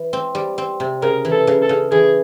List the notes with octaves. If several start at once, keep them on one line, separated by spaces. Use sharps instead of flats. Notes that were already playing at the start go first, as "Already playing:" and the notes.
Already playing: E3
C4
G3
C4
C3
C#3 A#4
E3
A4
C#3
A4
C#3
E3 G#4